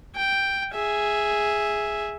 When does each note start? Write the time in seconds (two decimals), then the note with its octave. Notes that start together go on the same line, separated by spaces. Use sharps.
0.16 G5
0.74 G#4 E5